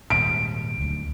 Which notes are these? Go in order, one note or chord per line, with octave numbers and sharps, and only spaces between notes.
D#1 D#2 G#2 D7
D1 D2